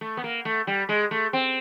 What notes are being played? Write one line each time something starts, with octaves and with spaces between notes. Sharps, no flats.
A3
B3
A#3
A3
G3
G#3
A3
C4